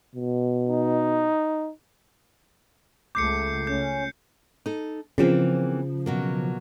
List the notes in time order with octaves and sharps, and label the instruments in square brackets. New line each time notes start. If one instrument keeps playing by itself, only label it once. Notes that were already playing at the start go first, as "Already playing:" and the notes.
[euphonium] B2
[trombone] D#4
[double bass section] C#2 A3 [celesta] D6 [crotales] G6 C7 C#7
[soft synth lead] C#4 [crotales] G6
[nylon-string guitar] D#4 A4
[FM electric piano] C#3 F3 [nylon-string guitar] E3 A#3 C4
[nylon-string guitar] B2 F#3 A#3